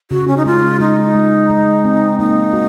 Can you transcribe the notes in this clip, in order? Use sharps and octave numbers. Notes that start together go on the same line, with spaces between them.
C#3 F#4
C#4
D#4
G#3 F4
G#3 D#4
G#3
G#3
C4
A#3 D#4
F#4